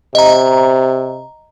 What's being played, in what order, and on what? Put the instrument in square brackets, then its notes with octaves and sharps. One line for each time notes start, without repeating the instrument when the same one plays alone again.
[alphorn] C3 [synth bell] D#5 A#5